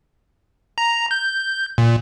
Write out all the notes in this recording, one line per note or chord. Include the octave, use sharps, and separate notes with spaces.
A#5
G6
A#2